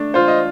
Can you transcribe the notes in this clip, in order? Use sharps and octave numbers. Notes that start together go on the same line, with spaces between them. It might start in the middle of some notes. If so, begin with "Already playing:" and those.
Already playing: A3 D4
F4 C5
D#5